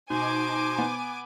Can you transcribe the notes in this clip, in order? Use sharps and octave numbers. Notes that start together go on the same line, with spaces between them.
B2 D#4 C5 G#5 D6
B3